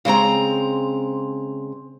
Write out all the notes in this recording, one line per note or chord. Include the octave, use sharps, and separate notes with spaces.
C#3 G#3 C4 A#5